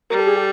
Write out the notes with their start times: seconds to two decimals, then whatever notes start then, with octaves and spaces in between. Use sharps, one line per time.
0.10 G3 A#4
0.19 A4
0.27 G#4
0.36 G4 A4